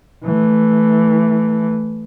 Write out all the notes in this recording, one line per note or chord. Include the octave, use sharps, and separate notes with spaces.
E3 A3